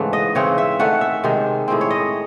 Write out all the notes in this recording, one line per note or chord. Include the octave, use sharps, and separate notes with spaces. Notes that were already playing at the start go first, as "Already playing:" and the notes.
Already playing: G#2 C#3 E3 A3 C#4 F#5
D#5
C#3 E3 C4 C#5
E5
D#3 A3 C#4 F#5
E5
C3 D#3 G#3
A2 G#3 C4
C#5
D#5